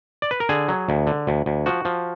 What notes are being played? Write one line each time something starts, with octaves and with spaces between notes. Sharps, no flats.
D5
B4
A#4
D3 G#4
F#3
D2
D3
D2
D2
F3 F#4
F3